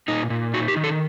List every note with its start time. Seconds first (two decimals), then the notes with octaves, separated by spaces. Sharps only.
0.08 A#2 D#4
0.30 A#2
0.54 D#4 F#4
0.68 G4
0.76 D#3
0.84 A4